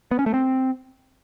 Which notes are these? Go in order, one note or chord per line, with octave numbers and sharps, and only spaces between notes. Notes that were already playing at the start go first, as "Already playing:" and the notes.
B3
C#4
A3
C4